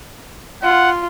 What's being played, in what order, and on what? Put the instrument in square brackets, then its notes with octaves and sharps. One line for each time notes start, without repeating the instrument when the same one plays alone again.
[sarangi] F4 [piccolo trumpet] F#5